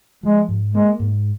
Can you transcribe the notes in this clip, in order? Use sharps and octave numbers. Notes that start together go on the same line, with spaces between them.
F3 G#3
G#2
G#3 A#3
G#2